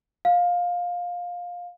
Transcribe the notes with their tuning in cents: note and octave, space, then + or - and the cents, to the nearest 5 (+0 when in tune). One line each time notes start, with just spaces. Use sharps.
F5 +15